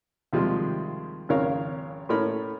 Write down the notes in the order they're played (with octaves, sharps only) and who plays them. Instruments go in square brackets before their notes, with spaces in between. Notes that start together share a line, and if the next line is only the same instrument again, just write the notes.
[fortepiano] D#2 C3 F3 G3 G#3
G#1 F2 C#3 A#4 C#5 F5
A2 A3 C#4 A#4 B5